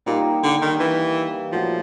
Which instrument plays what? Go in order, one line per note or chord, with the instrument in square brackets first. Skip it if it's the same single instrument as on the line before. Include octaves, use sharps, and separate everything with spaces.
[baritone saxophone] A#2 [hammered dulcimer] G3 A#3 D#4
[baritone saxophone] D3
D#3
E3
[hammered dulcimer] A#2 F#3 A3 [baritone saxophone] F3